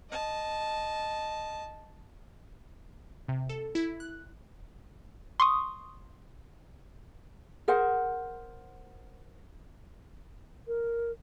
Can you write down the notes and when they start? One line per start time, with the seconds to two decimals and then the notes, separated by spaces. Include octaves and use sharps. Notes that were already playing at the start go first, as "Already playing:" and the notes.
0.10 D#5 A5
3.29 C3
3.49 A4
3.75 E4
4.00 F#6
5.40 C6 C#6 D#6
7.68 G#4 A#4 C5 F#5
10.67 A#4